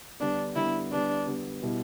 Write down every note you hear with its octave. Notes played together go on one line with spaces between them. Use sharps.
D3 G3 B3 D4
D3 G3 B3 E4
D3 G3 B3 D4
D3 G3 B3
B2 G3 B3 E4